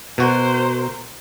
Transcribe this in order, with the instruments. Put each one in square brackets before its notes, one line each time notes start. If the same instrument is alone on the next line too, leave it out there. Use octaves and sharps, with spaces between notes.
[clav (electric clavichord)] B2 F#4 [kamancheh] A#4 C5